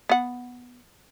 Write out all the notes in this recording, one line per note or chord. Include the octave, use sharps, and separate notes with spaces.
B3 F#5